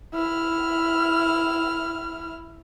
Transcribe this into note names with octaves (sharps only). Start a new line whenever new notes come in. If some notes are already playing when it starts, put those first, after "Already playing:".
E4 F6